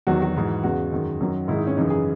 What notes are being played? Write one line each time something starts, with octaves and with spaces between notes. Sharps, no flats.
E2 D#3 F#3 F#4
F#4
G#2 E3 G#3
E2 C#3 G#3 F#4
F#2 D#3 G#3
F#2 D#3 F#3
G#2 D#3 G#3 E4
D#4
C#4
F#2 C#3 E3 G#3 D#4
G#4